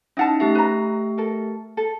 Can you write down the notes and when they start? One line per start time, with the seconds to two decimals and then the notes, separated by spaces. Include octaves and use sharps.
0.17 C#4 D#4 E4 F#5 A5
0.40 A3 G4 E5
0.55 B4 A#5
1.18 A4 A#4
1.77 A4